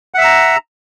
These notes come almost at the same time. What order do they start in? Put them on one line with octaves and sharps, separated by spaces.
F#5 E5 E6 A#5